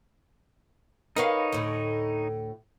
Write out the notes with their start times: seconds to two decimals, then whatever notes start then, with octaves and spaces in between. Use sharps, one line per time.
1.16 D#4 A#4 B4 C#5 F5
1.52 D2 A2